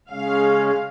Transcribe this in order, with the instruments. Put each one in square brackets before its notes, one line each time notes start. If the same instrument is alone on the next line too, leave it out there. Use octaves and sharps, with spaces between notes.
[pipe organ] C#3 G#3 C#4 [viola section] F5